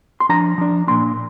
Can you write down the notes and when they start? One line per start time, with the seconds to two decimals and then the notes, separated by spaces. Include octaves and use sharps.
0.20 C6
0.29 F3 D4 A#5
0.58 F3 D4
0.87 A#2 A#3 D4 C6